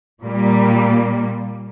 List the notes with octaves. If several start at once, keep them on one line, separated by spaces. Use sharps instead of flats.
A#2 G3 A#3